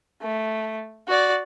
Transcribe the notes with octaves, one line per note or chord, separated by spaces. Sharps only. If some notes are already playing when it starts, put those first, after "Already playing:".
A3
F#4 D5